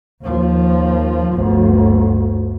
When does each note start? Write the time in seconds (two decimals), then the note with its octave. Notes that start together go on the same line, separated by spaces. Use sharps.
0.23 D#2 F3
1.33 G1 D2